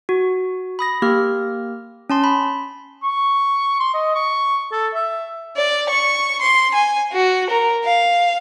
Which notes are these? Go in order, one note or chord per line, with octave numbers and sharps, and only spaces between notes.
F#4
B5 D#6 A#6
A#3 G4 F6
C#4 A5 C6
B5
C#6
C6
D#5
C#6
A4
E5
D5
C#6
C6
G#5
F#4
A#4
F5